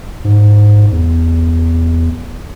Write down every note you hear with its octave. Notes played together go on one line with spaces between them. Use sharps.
G#2
E2